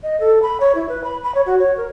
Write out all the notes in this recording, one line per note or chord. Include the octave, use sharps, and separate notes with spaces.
D#5
A4
B5
C#5
E4
B4
B5
B5
C#5
F#4
C#5
A#4